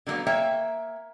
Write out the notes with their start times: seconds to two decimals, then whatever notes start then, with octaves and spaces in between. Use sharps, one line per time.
0.07 D3 F#3 G#3 A#3 B3
0.27 A#3 C#5 E5 G5